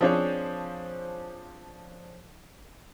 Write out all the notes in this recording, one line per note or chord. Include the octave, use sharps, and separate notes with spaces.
F3 C4 D4 G#4 C5 C#5